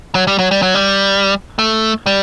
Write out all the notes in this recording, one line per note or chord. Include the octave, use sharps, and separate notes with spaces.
F#3
G3
F#3
G3
F#3
G3
A3
G3